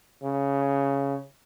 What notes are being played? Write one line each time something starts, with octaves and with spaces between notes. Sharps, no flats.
C#3